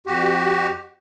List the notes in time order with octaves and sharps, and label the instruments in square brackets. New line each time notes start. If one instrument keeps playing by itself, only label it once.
[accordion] F2 F#4 G4